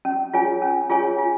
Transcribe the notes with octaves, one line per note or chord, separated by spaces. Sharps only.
C#4
F4 G#4 C#5 G#5
C#4
F4 G#4 C#5 G#5
F4